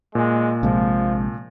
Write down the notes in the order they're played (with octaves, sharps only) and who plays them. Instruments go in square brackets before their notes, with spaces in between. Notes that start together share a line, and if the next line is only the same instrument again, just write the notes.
[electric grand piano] A#2 [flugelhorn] G#3
[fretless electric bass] A#1 C3 G#3 [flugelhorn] F3